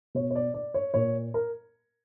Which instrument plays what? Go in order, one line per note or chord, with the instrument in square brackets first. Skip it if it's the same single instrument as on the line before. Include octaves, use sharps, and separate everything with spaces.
[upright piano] B2 C#5
C#5
D5
D5
C#5
A#2 C#5
A#4